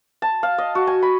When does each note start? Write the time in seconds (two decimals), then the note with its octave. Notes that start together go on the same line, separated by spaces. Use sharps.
0.22 A5
0.43 F5
0.58 D#5
0.75 F#4
0.87 G#5
1.02 B5